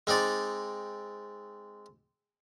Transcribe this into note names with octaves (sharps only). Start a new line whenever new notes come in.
G#3 C4 D#4 D5